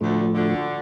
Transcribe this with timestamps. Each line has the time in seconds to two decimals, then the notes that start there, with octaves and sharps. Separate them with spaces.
0.01 D2 A2 D3 F3 A3
0.34 D2 D3